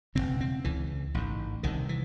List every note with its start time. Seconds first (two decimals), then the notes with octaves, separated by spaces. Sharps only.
0.15 E1 D#2 C#3 C4
0.41 C4
0.64 C#2 C#3 E3
1.14 A1 G#2
1.63 C2 C3 D#3
1.89 E3